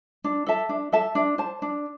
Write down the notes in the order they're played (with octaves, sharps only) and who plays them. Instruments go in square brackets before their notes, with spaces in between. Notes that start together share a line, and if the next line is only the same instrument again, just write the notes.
[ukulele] D4
A4 E5 A5
D4
A4 E5 A5
D4
C5 A5
D4